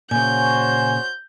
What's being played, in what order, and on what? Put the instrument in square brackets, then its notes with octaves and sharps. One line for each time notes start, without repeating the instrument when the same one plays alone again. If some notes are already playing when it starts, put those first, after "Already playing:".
[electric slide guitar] A#2 C#3 [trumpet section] F#4 C5 C#5 [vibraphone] G#5 [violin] G6